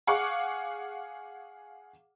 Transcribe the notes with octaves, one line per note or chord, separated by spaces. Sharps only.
G#4 F5 F#5 C#6 D6